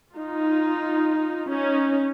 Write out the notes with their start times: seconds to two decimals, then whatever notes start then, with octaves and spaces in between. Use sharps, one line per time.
0.15 D#4 F4
1.49 C#4 D#4